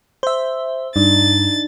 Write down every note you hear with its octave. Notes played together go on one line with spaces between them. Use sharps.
C5 E5
G2 D4 D#4 A6